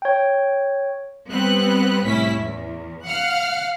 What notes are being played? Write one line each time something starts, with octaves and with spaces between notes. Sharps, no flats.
C#5 G5
G3 B3 C4 B4 F#6
C2 A2 C#4 E4 B6
E2
F5 F#5 F6 F#6